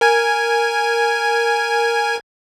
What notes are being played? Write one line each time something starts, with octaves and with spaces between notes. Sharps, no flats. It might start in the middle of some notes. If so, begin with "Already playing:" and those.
A#4 G#5 G#6